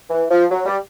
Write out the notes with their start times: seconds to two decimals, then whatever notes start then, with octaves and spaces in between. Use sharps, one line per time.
0.10 E3
0.31 F3
0.51 F#3
0.66 G3